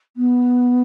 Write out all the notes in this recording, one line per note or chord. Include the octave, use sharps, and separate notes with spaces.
B3